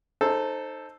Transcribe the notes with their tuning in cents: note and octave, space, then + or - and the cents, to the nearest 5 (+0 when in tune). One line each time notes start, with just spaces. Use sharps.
D#4 -15 A4 +0 C5 +10